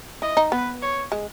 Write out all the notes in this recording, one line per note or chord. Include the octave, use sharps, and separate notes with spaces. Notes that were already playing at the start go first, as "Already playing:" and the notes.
E4 D#5
D#4
B3 B4
C#5
G#3